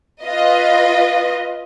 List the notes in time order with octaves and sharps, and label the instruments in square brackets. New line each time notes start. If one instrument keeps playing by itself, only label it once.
[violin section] F4 B4 D#5